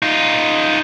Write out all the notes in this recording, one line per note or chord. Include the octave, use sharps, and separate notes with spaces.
D#4 F4